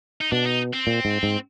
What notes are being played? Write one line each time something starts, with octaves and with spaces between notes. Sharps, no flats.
D#4
B2 D4
D#4
C4
A#2
G#2
G#2